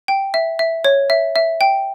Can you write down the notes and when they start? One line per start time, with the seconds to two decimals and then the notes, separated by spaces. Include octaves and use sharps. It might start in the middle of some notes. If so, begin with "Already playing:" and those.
0.08 G5
0.34 E5
0.59 E5
0.85 C#5
1.10 E5
1.36 E5
1.61 G5